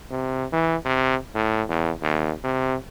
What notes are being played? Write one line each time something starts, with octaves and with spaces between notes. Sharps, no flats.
C3
E3
C3
A2
E2
D#2
C3